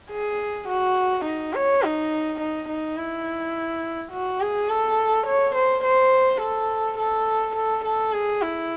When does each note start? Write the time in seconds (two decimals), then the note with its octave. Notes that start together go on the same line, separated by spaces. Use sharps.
0.11 G#4
0.69 F#4
1.25 D#4
1.54 C#5
1.83 D#4
2.41 D#4
2.69 D#4
2.98 E4
4.13 F#4
4.41 G#4
4.69 A4
5.27 C#5
5.56 C5
5.84 C5
6.42 A4
6.99 A4
7.56 A4
7.85 A4
8.13 G#4
8.42 E4